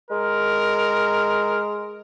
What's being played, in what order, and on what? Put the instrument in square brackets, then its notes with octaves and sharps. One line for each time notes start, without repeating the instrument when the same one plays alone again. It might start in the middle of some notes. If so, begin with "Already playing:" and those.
[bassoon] G#3 [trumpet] A#4